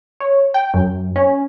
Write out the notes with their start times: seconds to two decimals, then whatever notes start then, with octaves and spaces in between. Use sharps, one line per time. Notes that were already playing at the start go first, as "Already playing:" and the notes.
0.20 C#5
0.54 G5
0.74 F#2
1.16 C#4